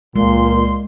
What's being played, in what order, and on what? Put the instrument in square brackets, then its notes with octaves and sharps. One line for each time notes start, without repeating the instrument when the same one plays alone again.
[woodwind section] C#2 C6 [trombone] A#2 [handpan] G#3